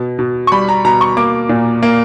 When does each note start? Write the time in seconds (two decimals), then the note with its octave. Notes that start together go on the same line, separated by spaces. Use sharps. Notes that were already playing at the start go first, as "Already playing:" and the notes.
Already playing: B2
0.19 B2
0.47 C#6
0.52 G3 B5
0.69 A#5
0.85 B2 A#5
1.01 C#6
1.17 A#3 D6
1.49 A#2
1.82 A#3